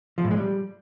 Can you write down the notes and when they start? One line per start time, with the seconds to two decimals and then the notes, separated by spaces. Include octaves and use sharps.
0.18 F3
0.24 A2
0.31 G#3
0.37 G3